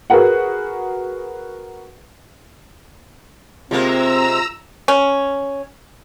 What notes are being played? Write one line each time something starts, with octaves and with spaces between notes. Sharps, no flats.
F#4 G#4 A#4 B4 F#5
C3 G#3 A#3 C4 F4 A#5 E6
C#4